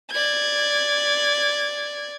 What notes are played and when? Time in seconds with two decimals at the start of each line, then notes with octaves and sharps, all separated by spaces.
0.11 D5 G#6